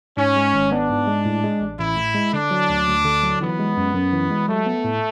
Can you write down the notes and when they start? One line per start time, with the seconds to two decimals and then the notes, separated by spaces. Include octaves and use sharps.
0.17 G#2 C#4
0.36 G#3
0.54 G#1
0.71 B3 D4
0.89 G#2
1.07 G#3
1.25 A2
1.44 G#3
1.61 A1
1.79 A1 E4
1.97 A2
2.15 G#3
2.33 D3 D4
2.51 F#3
2.70 D2
2.87 D2
3.05 D3
3.23 F#3
3.41 E3 B3
3.59 G#3
3.77 F#2
3.94 F#2
4.13 E3
4.30 G#3
4.48 F#3 A3
4.66 B3
4.84 A2